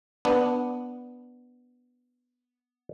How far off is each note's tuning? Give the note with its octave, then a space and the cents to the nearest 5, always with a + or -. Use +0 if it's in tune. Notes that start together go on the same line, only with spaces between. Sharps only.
B3 +0 D4 +0